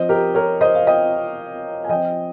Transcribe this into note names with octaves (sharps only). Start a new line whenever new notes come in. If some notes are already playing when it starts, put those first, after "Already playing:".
Already playing: F3 C4 C5 D#5
G4 A#4
A#4 C#5
C5 D#5
F5
D#5 G5
G#5
F3 C4 D#5 G5